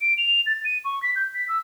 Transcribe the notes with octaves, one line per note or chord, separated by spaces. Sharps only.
D7
F7
A6
D#7
C#6
B6
G6
B6
E6